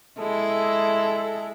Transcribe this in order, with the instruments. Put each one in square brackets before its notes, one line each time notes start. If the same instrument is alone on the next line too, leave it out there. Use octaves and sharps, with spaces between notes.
[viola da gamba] G#3 E4 [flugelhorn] A4